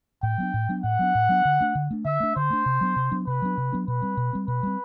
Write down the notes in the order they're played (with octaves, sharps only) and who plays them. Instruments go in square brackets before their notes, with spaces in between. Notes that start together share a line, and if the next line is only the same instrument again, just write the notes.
[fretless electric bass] A2 [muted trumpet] G5
[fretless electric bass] F#3 B3 D4
A2
F#3 B3 D4
[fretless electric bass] A2 [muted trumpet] F#5
[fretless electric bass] F#3 B3 D4
A2
F#3 B3 D4
D3
A3 D4
D3
A3 D4
[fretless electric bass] D3 [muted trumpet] E5
[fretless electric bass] A3 D4
[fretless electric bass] D3 [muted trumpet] C5
[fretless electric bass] A3 D4
C3
F#3 B3 D4
C3
F#3 B3 D4
[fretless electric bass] C3 [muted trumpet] B4
[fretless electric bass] F#3 B3 D4
C3
F#3 B3 D4
[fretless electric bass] B2 [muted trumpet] B4
[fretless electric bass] G3 C4
B2
G3 C4
[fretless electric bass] B2 [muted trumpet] B4
[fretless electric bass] G3 C4